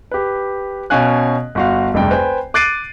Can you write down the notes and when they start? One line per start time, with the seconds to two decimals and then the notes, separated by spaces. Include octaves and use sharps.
0.11 G4 B4
0.90 B2 C#4 F5 G#5 F#6
1.55 G1 F#4 F5
1.94 F1 C#2 G2 G5
2.10 B4 C5 G5 G#5
2.54 D6 F#6 A6 C7 D7 D#7